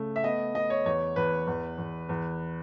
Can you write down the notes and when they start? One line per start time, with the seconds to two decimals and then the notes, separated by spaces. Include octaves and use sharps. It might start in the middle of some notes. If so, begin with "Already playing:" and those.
Already playing: C#3 A3
0.16 E5
0.23 B3 D#5
0.54 B3 D#5
0.70 C#5
0.85 E2 C#5
1.16 E2 B4
1.47 E2
1.78 E2
2.09 E2